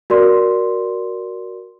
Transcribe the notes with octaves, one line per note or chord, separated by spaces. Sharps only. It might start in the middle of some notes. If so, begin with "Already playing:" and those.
F#4 A#4 D5 C6